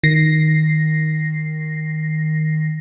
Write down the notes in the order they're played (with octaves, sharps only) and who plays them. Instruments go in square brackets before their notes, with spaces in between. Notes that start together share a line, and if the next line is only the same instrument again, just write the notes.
[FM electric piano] D#3 A#6 C7